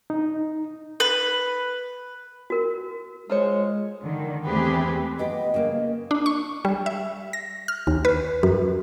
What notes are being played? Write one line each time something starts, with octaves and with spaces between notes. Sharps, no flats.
D#4
B4
F#4 A#4
G#3 F4 C5 C#5
D3 D#3
E2 A3 C4 G4 G#4 B4
B3 G4 D#5
C#3 A#3
D4
C#6
G3
E5
A#6
F6
D#2
B4
F#2